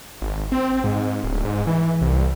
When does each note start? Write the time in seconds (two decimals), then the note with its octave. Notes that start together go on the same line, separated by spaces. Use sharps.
0.22 G#1
0.52 C4
0.84 G#2
1.24 D1
1.45 G#2
1.67 E3
2.01 C2